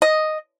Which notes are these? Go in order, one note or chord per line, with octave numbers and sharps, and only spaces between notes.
D#5